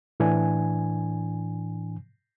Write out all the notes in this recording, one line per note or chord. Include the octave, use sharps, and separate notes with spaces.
A2 E3 D4 G#5